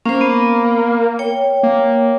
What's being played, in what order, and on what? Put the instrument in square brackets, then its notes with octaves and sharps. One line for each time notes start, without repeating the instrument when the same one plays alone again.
[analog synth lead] A#3 [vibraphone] C#4 C5
[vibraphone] B3
C#5 G5
[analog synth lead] A#3